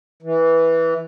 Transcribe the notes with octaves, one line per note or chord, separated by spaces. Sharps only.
E3